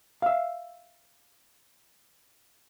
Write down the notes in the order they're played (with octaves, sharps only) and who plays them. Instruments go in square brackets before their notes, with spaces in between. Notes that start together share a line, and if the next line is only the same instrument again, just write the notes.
[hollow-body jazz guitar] E5 F5